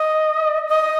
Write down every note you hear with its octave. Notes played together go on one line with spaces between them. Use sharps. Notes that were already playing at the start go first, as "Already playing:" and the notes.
Already playing: D#5
D#5